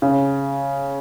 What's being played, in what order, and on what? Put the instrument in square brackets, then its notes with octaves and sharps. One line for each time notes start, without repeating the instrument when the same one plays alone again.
[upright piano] C#3